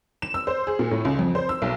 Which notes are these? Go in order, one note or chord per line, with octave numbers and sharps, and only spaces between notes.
E7
E6
C5
G#4
A#2
A2
C#2
F2
C5
E6
B1